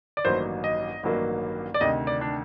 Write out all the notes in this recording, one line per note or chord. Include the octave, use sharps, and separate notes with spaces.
D5
A1 G2 D#3 F#3 A#3 C5
D#5
A1 G2 D#3 F#3 A#3
D5
D2 C3 D#3 D#5
D5
D4